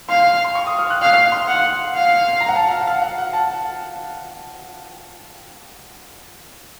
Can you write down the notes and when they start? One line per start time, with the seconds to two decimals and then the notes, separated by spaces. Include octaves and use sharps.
0.09 F5 C6
0.44 C6
0.55 C#6
0.67 D#6
0.79 F6
0.90 F#6
1.01 F5 F#6
1.17 F6
1.32 C6
1.48 F#5
1.94 F5
2.41 A#5
2.49 F#5
2.56 A5
2.71 F5
2.81 F#5
2.87 F5
3.02 F#5
3.18 F#5
3.33 A5